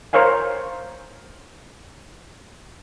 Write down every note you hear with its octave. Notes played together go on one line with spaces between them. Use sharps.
A#4 C5 C#5 F5 G#5